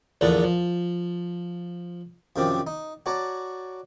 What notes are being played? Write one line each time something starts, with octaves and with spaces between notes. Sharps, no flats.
A#1 E2 A#2 D3 D4
F3
F#2 C3 D#3 F3 D4 D5
D#4
F#4 C#5 D5 A5 A#5